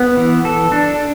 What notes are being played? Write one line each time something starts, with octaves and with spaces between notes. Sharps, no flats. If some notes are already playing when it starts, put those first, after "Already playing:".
Already playing: B3
E3
A4
D4